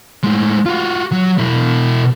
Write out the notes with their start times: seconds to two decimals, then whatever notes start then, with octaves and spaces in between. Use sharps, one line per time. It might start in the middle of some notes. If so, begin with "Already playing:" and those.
0.23 A2 G#3
0.66 F4 F#4
1.12 F#3
1.39 B2 E4